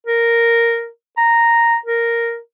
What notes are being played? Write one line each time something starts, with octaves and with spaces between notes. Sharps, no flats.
A#4
A#5
A#4